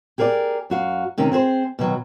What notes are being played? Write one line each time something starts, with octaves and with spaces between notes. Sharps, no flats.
G4 G#4 A#4 C5 D5
F#2 F#4 F5
C3 D#3 C4 C#4
C4 G#4 B4 C5
B2 D#3 F#3